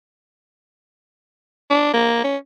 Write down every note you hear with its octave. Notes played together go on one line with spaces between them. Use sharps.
D4
A#3
C#4